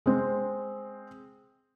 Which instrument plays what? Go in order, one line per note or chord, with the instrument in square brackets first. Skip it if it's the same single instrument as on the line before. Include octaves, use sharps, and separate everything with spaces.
[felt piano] G#3 C4